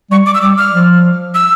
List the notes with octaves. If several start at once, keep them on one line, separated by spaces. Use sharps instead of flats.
G3 C#6
D6
E6
G3 D6
F6
F3
E6